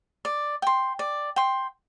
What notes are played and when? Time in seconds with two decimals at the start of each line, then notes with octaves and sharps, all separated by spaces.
0.25 D5
0.62 G5 C6
0.99 D5
1.36 G5 C6